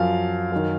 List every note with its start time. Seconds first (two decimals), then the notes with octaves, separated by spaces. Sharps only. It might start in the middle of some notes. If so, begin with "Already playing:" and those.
Already playing: F#2 F3 F5
0.52 F#2 D#3